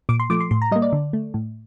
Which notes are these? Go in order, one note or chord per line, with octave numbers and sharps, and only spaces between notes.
A#2 D6
C6
F3 A3 D6
C6
A2 C6
A#5
G3 A#3 D#5
D5
D3
A3
A2